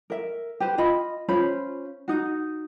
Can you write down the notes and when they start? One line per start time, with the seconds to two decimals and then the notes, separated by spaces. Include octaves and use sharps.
0.10 A#4 E5
0.60 G4 B4 C5
0.78 F4 D#5 B5
1.28 C#4 F4 C5 B5
2.08 D#4 F#4